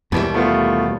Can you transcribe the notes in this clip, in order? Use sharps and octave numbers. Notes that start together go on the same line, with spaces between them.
D#2 B2 E3 G3
A3 B3 F4